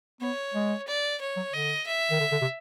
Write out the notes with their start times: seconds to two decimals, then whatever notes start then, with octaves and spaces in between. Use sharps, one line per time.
0.21 B3 C#5
0.54 G#3
0.87 D5
1.21 C#5
1.37 F#3
1.53 D3 D#5
1.87 E5
2.11 D#3
2.20 D3
2.32 D3
2.41 C3